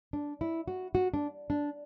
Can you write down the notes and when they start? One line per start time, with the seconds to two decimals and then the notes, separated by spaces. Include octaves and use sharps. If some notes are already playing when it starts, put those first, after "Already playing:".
0.13 D4
0.41 E4
0.68 F#4
0.95 F#4
1.14 D4
1.50 D4